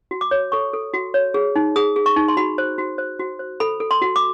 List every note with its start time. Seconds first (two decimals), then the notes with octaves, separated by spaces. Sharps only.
0.11 F#4
0.21 D6
0.31 C#5
0.52 A4 C#6
0.73 A4
0.94 F#4
1.14 C#5
1.34 G#4
1.56 D#4
1.76 G#4 D#6
1.96 G#4
2.06 C#6
2.16 D#4
2.28 C6
2.37 F#4 B5
2.58 C5
2.78 F#4
2.98 C5
3.19 F#4
3.39 C5
3.60 A4 B5
3.80 A4
3.91 C6
4.02 F#4
4.16 D6